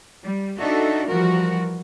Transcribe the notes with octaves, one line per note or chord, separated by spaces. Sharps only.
G3
D4 D#4 F#4 A4 E5
E3 F3 G3 F#4 A#4